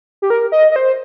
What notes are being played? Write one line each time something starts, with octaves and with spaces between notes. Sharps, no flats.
G4
A#4
D#5
D#5
C5